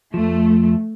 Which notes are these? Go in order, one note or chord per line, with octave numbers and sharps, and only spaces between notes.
F2 F3 A3